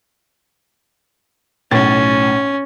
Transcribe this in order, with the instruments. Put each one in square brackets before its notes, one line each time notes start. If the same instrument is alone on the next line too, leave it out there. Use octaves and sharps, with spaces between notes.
[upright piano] B1 A2 A6 [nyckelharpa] C#4